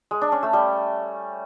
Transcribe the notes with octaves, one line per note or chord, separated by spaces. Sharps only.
G#3
D4
C#4
A3
G3